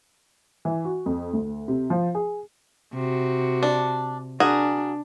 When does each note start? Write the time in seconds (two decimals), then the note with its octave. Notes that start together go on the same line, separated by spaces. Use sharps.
0.65 E3
0.85 F#4
1.06 F2
1.33 D2
1.68 C3
1.90 F3
2.15 G#4
2.93 C3 F#4
3.63 D4
4.40 D4 F#4 G#4 A#4